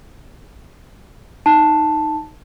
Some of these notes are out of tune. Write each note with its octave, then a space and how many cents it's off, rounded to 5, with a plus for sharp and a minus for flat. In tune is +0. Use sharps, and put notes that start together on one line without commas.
D#4 +0 A5 +0